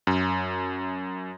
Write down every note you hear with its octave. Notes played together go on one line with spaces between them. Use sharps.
F#2